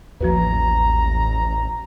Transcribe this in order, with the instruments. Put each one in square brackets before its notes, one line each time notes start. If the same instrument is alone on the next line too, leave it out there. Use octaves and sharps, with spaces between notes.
[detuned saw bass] A1 [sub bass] D#2 [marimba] F3 F#4 B4 [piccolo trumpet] A#5